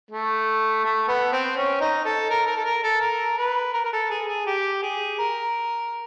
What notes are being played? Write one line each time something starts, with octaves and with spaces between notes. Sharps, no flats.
A3
A3
B3
C4
C#4
D#4
A4
A#4
A#4
A4
A#4
A4
A#4
B4
A#4
A#4
A4
G#4
G#4
G4
G#4
A#4